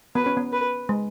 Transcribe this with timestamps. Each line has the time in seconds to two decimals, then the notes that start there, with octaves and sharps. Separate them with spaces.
0.15 B3 B4
0.26 C#4
0.37 B3
0.53 B4
0.89 G#3